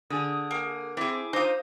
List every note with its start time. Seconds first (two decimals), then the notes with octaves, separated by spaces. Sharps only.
0.10 D3 G#4 D#6
0.51 A#3
0.97 C4 E4 G#4 D6
1.33 D#4 F4 C5 D#6